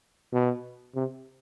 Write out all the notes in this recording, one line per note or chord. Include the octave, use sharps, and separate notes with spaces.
B2
C3